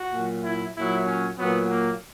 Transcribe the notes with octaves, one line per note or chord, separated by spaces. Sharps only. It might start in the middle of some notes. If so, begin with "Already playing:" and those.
Already playing: F#4
A#2 F#3
E4
A#2 F#3 E4
C#4
A#2 F#3 B3
A#3